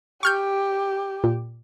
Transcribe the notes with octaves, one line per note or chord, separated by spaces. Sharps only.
G4 C#6 F6 G6
A#2